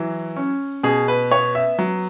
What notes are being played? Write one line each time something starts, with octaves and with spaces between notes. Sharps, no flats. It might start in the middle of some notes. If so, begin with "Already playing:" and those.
Already playing: E3 F#3
C#4
B2 G#4
B4
B3 C#5
E5
F#3